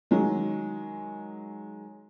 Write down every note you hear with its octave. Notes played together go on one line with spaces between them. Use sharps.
D#3 F#3 G#3